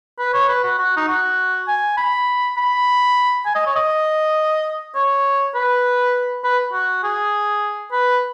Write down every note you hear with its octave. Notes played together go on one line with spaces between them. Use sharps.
B4
C#5
B4
F#4
F#4
D#4
F#4
G#5
B5
B5
G#5
D#5
C#5
D#5
C#5
B4
B4
F#4
G#4
B4